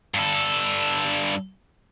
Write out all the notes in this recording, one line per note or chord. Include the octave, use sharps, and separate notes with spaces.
G2 A4